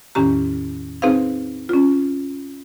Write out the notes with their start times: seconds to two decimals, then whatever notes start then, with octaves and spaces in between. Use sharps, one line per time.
0.15 E2 A2 D#3 C#4 G4 A#5
1.02 C4 D#4 G#4 B4 C5 F5
1.69 C#4 F4